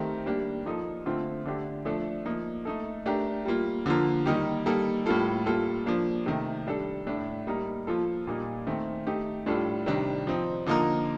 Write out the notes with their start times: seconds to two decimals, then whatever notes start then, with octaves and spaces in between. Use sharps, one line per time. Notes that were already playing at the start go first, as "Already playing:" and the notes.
Already playing: D#3 A3 C4 G4 A#4
0.26 G3 A#3 D4 G4
0.66 F3 A#3 D#4 A4
1.06 D3 A3 C4 F4
1.45 D3 A3 D4 G4
1.85 F3 A3 D4 A4
2.25 F3 A#3 D#4
2.65 A3 D#4 A4
3.06 A3 D4 G4 A#4
3.45 G3 A#3 F4
3.86 D3 F3 A#3 F4 A#4
4.26 D#3 G3 A#3 D#4 G4
4.66 G3 A#3 D#4 A4
5.06 A2 G3 A#3 F4 A4
5.46 G3 A#3 F4 A4
5.86 F3 A#3 D4
6.26 C3 D#3 A3
6.67 G3 D4 A4
7.07 A2 A3 D4
7.47 G3 A#3 D#4 A#4
7.87 F3 A#3 F4 A4
8.27 A#2 G3 A#3 D#4
8.67 D#3 A3 C4
9.07 A3 D#4 G4
9.46 A2 G3 D4 F4 A4
9.86 C3 D#3 G3 D4
10.27 F3 C4 D#4
10.66 D3 F3 A#3 D#4 A#4